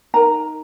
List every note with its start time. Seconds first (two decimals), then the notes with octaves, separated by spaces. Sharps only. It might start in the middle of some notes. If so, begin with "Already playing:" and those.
0.14 D#4 A#4 A#5